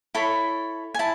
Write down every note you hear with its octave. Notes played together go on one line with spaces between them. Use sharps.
E4 A4 C#5 B5
G#5
E4 A5